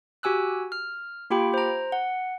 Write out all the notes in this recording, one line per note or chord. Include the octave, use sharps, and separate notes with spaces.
F#4 G4 G#5 E6 F#6
F6
A#3 F4 G4 G5 B5
C5 A#5
F#5